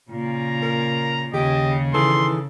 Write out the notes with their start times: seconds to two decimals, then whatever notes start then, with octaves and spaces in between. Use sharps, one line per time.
0.10 A#2 C#3 A#5
0.62 A#4
1.34 D#2 C#3 G4 D#5
1.94 D#3 E3 G#4 A4 C6